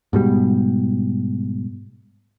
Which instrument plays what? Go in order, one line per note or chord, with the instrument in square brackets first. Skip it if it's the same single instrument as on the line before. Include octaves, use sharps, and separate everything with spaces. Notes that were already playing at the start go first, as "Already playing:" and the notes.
[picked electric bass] G#2 B2 G3